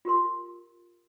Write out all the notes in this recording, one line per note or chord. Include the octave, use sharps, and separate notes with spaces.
F4 G4 A#4 C6